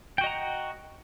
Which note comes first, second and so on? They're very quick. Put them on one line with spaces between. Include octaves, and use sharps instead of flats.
G5 F#4 D#5 A#5 F#5